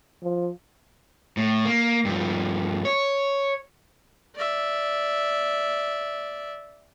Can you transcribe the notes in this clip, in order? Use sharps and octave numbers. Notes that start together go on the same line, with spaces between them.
F3
A2
A#3
G2 F3
C#5
D5 E5